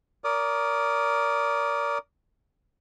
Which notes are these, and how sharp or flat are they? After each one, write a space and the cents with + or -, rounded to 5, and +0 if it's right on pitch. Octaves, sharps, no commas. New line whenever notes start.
A#4 +0 D5 -35 D#6 -40